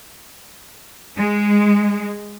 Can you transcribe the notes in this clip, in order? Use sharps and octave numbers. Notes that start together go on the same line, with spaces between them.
G#3